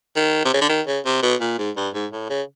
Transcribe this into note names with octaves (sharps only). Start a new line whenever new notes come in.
D#3
C3
C#3
D3
D#3
C#3
C3
B2
A#2
G#2
G2
G#2
A2
C#3